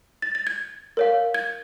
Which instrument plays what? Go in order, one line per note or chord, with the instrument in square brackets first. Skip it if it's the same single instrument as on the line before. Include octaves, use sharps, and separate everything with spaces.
[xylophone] A6
A6
G#6
A#4 C#5 F5
G#6